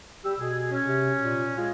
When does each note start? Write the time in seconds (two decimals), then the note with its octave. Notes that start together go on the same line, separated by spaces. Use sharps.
0.25 G3 G4 E6
0.40 B2 G#4
0.71 C#4
0.85 C3
1.19 A#2
1.57 G#3 F4